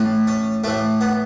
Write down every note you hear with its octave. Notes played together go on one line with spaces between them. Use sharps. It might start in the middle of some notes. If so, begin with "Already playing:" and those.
Already playing: A2 E3
C#4
A2 E3 A3
B3